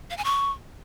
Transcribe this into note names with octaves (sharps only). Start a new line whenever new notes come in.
F5
G#5
C#6